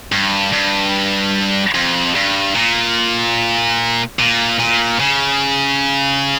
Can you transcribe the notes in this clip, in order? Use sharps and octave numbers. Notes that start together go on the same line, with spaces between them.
G2
G2
F2
G2
A#2
A#2
A#2
C#3